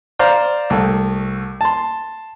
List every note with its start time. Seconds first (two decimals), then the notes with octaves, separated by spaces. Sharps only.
0.19 C5 D5 F5 A#5
0.70 C2 A3
1.61 A5 C6